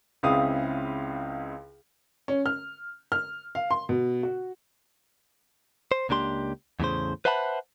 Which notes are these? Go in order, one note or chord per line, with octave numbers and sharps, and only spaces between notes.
C#2 C#3 C4 E4 F5 D#6
C#4
F6
F6
F5
C6
B2
F#4
C5
C#2 A#3 D4 G4 C6
E2 A2 C#3 C5
B4 C5 E5 F#5 A5 B5